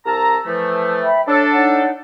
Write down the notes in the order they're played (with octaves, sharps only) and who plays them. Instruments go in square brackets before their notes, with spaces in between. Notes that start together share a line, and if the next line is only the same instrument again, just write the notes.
[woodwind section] C2 A5 A#5 [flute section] E6
[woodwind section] E3 F3 A3
[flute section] E5 G5 B5
[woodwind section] D4 A4 [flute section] C#5
[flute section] D#4 C#5 F#5